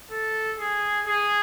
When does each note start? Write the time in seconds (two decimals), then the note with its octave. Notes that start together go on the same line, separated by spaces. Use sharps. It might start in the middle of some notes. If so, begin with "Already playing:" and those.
0.11 A4
0.59 G#4
1.06 G#4